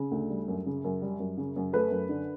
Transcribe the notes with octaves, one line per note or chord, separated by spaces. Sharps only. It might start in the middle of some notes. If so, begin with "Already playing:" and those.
Already playing: C#3
D2
G3
F#2
C#3
F#2
G3
F#2
C#3
F#2
A3 B4
F#2
D3